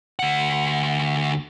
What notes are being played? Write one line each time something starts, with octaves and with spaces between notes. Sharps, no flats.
D2 F#5